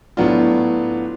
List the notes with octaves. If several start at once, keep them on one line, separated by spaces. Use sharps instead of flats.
A2 F#3 B3 D4 F4